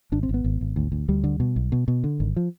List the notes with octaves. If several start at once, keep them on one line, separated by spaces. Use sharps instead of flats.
G#1 D4
C4
G#1 B3
G#1
G#1
D2
D2
D2 G3
D3
B2
B1
B2
B2
D3
G#1
F3